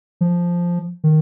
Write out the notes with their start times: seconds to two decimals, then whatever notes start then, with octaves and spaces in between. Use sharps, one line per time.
0.21 F3
1.04 D#3